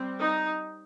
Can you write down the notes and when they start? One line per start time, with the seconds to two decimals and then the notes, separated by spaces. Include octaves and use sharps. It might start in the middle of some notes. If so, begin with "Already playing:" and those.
Already playing: G3 C4
0.19 D#4